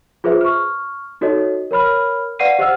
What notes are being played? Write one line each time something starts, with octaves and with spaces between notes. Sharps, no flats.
F4 G#4 B4 C5 E5
C#6 F6
D#4 F#4 A4 C#5 D#5
A#4 C#5 B5 F6
B4 D5 F5 F#5 C7 D#7
G4 C5 D#5 F#5 E6 F6